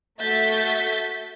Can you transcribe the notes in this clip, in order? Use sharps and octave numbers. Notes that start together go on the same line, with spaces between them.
A3 F#4 E5 G6 A6 B6